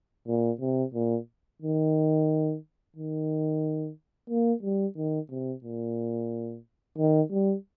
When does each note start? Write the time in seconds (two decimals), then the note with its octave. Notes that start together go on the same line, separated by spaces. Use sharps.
0.28 A#2
0.61 C3
0.94 A#2
1.62 D#3
2.96 D#3
4.30 A#3
4.63 G3
4.96 D#3
5.30 C3
5.64 A#2
6.98 D#3
7.31 G3